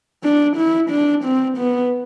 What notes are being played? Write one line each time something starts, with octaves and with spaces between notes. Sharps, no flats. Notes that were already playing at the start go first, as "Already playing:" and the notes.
D4
E4
D4
C4
B3